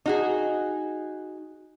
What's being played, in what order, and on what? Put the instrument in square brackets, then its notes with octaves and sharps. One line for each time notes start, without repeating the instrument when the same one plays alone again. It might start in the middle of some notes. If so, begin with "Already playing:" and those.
[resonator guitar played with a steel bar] D#4 F#4 G#4